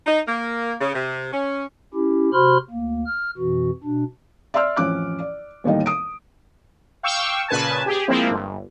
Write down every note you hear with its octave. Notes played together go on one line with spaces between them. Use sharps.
D#4
A#3
C#3
C3
C#4
C#4 E4 G4
C3 F#4 C5 B5 C6 F6
D2 A#3
F6
F2 B2 E3 F#4
B2 D4
D5 E5 C6 E6 F6
A1 F2 C#4 D6 F#6
D5
E1 D#2 A2 G3 D#4 D#5
D#6 D7
F5 G5 C#6 D6 E6
A#2 C#3 B4 G#5 A5
G4 G#4
F3 G#3 A#3 C4 E4
G1